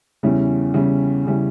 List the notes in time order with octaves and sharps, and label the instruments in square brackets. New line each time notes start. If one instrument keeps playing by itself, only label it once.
[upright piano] E2 C#3 G3 C#4 E4
E2 C#3 G3 C#4 E4
C#3 G3 C#4 E4